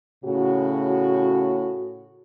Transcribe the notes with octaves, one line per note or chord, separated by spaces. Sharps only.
A2 C#3 F#4